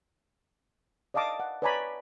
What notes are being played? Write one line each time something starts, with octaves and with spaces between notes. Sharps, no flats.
D5 D#5 F5 A5 D6 D#6
F#5
B4 C#5 D5 G#5 A#5 B5